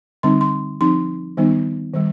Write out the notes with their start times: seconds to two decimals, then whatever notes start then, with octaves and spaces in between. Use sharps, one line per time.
0.23 D3 G3 C4 D#4 C6
0.41 C6
0.81 F3 C4 D#4 C6
1.37 D#3 G3 B3 D#4
1.94 D#3 G3